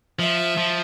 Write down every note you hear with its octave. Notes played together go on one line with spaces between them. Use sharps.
F3 E5
F3